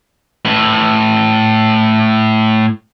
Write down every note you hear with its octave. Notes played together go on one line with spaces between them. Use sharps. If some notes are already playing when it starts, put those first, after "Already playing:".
A2 B4